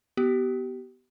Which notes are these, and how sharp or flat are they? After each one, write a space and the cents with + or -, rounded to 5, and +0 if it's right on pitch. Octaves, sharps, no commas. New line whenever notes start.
B3 +0 G4 -30